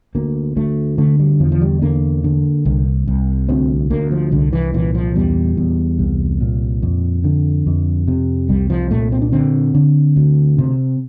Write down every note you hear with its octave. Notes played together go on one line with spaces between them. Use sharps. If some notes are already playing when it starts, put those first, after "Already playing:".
D2 A#3
D2 A3
D3 A3
G3
E2 F3
F3
G3
D3 A#3
D3
C2
C2
D2 C4
D2 A#3
F3
C2 D3
E3
A#2 E3
F3
E2 G3
E2
C2
A#2
F2
D3
F2
C3
C2 G3
F3
A#2 A3
C4
D4
D3 C4
D3
D2
C3